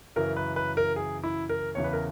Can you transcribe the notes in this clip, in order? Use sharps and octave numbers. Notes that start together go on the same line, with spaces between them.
F#2 C#3 E3 A#4
B4
B4
A#4
G#4
E4
A#4
E2 C#3 E3 C#5
B4
A#4